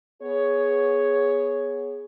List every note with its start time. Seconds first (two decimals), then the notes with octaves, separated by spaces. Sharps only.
0.22 B3 G#4 C#5